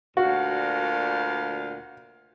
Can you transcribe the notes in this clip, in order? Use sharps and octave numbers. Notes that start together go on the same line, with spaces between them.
D2 A#2 F#4 F5